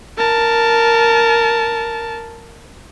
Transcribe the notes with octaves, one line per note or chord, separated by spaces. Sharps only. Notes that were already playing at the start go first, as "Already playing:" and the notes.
A#4 A5